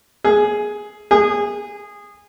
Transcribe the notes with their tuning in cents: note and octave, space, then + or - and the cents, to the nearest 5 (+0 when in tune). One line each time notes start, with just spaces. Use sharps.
G#4 +10
G#4 -20